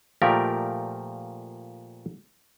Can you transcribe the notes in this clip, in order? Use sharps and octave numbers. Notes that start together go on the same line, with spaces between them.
A#2 F3 A3 G4 A#4 D5